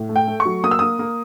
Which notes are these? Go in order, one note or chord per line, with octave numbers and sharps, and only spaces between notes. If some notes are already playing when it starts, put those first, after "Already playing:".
Already playing: A2
A3
G5
A3
C#6
F#3
A#3 D#6
E6
A#3 D#6
A#3